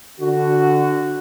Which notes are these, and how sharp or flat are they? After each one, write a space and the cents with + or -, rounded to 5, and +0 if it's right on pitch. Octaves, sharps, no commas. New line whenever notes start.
D3 +0 F#4 +0